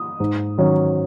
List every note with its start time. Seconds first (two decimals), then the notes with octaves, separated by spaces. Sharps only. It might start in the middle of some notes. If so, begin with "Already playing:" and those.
Already playing: D#6
0.20 G#2
0.58 D#3 F#3 C#4